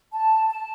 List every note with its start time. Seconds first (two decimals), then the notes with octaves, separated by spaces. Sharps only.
0.12 A5
0.50 A5